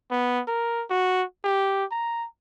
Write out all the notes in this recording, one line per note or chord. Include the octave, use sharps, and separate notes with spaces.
B3
A#4
F#4
G4
A#5